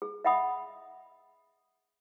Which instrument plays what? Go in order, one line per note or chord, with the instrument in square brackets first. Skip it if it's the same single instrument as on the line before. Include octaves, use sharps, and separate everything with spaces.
[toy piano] G#4
D#5 E5 F#5 B5 D#6